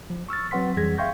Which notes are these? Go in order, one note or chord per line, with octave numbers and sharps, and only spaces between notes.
F3
C#6 E6 F6 A6
F#3 C4 B4 F#5 C6 B6
F2 E3 G3 G#4 G#6 A#6
E5 F5 G5 C6 C#6 G6